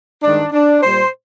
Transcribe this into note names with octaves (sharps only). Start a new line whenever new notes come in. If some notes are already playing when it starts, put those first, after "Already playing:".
G2 D#3 G#3 D4
D4
A#2 G3 A#3 C5